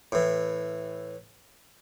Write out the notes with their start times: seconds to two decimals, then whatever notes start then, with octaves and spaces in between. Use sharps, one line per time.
0.12 A2 E3